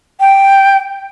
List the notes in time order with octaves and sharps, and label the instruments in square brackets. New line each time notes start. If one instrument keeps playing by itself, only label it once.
[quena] G5